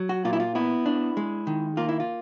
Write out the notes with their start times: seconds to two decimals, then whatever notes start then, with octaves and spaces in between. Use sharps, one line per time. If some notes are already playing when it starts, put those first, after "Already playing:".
Already playing: F#3
0.09 F#4
0.25 A#2 F4
0.33 E4
0.40 F4
0.55 B3 E4
0.86 D4
1.17 G#3
1.47 D#3
1.77 A#3 F4
1.89 E4
2.00 F4